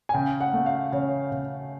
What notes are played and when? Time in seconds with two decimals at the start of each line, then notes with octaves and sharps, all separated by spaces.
0.09 G#5
0.14 C#3 G5
0.40 F#5
0.53 A3
0.66 F5
0.92 C#3 C#5
1.32 C#3